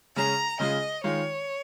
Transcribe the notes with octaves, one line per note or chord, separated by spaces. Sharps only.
C#3 G#3 C#4 G#4 A#5
C#3 G#3 F4 G#4 D#5
D#3 G#3 F4 C#5